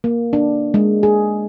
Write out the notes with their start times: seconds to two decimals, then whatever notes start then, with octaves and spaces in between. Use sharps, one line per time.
0.04 A#3
0.33 D4
0.74 G#3
1.03 G#4